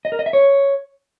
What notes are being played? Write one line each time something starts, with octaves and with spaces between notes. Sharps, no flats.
D#5
A#4
D#5
E5
C#5